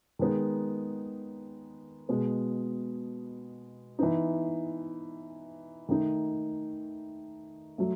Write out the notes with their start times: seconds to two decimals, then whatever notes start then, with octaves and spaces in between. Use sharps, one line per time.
0.19 D#3 G#3 B3 D#4
2.09 B2 G#3 B3
3.99 E3 B3 D#4
5.89 D#3 A3 D#4
7.78 F#3 A3